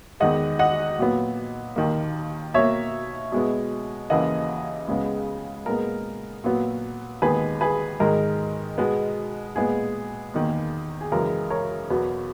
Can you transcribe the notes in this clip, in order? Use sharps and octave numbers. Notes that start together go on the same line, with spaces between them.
E2 D#3 G#3 D#5 F#5
D#5 F#5
A#2 F#3 B3
D#2 D#3 A#3
B2 A#3 C#5 E5
B2 G#3 B3
D#2 C#3 E3 A#3 D#5 F#5
C#2 C#3 G#3 B3
A#2 G#3 B3 A#4
A#2 F#3 B3
D#2 D#3 G#3 B3 G#4 B4
G#4 B4
G#2 D#3 G#3 A#4
B2 G#3 B3
A#2 G#3 B3 G#4
E2 D#3 A#3
G#4
F#2 C#3 E3 G#3 A#4
A#4 C#5
E2 B2 F#3 B3